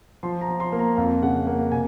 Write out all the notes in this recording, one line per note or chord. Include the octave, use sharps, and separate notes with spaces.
F3 C6
A#5
F3
C6
A#3
A#5
F2 F5
C#3 F#5
A#3 F#5
C3 G#5